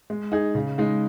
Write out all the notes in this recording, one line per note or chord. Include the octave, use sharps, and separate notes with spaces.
G#3
D#4 G#4
C#3
G#3 D#4